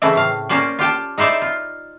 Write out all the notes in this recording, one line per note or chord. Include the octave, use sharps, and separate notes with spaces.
C#3 E3 A3 C4 E4
A2 F5
A#3 C#4 C5 D5
F4 G4 G5 A5
D#4 E4 C5 D5 E5
F4